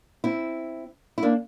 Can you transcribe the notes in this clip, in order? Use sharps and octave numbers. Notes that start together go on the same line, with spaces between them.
C4 E4
E4
A#3 D4